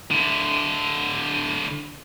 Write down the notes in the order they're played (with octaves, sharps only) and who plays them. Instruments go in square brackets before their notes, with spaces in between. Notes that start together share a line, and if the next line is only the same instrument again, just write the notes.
[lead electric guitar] D3 E4